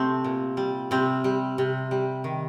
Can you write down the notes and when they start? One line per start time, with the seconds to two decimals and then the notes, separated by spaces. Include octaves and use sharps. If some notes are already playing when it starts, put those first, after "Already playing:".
Already playing: C3 A3 C4
0.24 A#2
0.57 G3
0.91 C3 G3 C4
1.24 G3
1.58 C3
1.91 G3
2.24 D#3